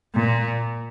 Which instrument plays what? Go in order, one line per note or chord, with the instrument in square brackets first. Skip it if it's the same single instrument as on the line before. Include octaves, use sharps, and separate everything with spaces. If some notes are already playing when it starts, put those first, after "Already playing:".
[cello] A#2